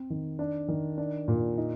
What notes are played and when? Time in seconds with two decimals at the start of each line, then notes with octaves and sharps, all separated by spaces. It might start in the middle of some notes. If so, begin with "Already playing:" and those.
Already playing: C4
0.10 D#3
0.39 D4
0.68 D#3
0.98 D4
1.28 A#2
1.58 D#4